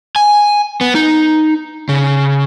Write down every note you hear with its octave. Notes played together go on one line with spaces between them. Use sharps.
G#5
B3
D#4
C#3